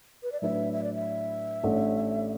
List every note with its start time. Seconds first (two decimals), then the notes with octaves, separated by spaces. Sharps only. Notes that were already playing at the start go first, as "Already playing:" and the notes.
0.23 B4
0.32 D5
0.42 A2 F#3 D4 B4 E5
0.73 E5
0.83 D5
0.94 E5
1.64 A1 A2 A3 D4